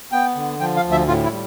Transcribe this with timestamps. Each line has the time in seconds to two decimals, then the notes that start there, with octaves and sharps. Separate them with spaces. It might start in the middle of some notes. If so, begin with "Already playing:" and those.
0.12 B3 G5
0.36 D3
0.60 F3 G5
0.76 F5
0.84 D2
0.92 E5
1.08 A2 F4
1.24 E4
1.31 G3